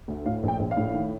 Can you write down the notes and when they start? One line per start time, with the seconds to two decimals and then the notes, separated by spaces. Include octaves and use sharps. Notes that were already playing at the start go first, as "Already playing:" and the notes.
0.08 D2
0.26 A2 F5
0.43 A#1
0.48 G5
0.59 A#1
0.71 F5
0.77 A2
0.94 D#3